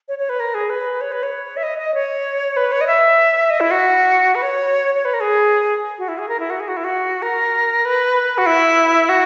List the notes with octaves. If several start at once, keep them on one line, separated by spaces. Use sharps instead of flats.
C#5
C#5
B4
A#4
G#4
B4
C#5
B4
C#5
E5
D#5
D#5
C#5
B4
C#5
D#5
E5
D#5
E4
F#4
B4
C#5
C#5
B4
A#4
G#4
F#4
E4
G#4
A#4
E4
F#4
G#4
F#4
E4
F#4
A#4
B4
F#4
E4
F#4